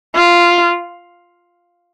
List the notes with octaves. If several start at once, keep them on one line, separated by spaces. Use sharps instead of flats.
F4